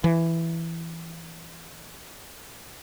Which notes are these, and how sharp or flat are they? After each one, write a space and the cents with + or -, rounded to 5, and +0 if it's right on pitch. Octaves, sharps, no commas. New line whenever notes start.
E3 +5